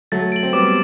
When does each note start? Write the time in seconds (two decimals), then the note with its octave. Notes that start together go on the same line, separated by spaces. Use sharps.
0.12 F#3 A3 A6
0.32 D7 F#7
0.43 C4
0.53 G3 B3 D6